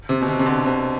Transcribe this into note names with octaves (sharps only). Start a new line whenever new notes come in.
C3
B2
C3
C3
D3
C3